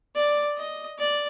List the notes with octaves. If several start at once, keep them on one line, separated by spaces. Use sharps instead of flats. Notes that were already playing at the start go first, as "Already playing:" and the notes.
D5
D#5
D5